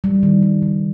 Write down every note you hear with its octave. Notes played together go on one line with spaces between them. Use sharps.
G3
D#3
G3
C#3